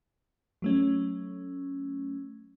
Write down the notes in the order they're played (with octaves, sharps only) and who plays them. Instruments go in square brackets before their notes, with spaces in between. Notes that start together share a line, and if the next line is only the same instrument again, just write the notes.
[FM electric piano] F#3 A3 C#4